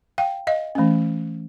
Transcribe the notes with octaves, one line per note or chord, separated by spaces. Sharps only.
F5 G5
D#5 F5
E3 A3 C#4